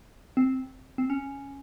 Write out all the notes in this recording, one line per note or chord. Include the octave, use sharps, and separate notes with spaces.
C4
C4
C#4